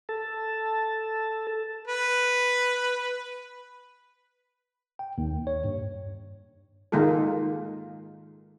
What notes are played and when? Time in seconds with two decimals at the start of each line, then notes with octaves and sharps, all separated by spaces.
0.09 A4 A5
1.87 B4
4.99 G5
5.18 D#2
5.47 C#5
5.64 G2
6.92 D#3 G#3 A#3 F4 A4